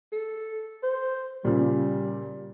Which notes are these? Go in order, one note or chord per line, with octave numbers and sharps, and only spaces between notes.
A4
C5
A#2 C#3 G3